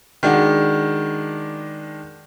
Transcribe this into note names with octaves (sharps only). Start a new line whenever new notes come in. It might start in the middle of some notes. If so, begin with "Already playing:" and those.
D#3 G#3 D4 F#4